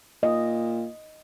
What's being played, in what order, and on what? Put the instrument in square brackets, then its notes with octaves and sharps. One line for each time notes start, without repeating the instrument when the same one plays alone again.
[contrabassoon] A#2 [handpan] D#5